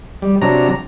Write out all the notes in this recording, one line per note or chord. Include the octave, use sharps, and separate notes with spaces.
G3
C3 F#3 D4 A#5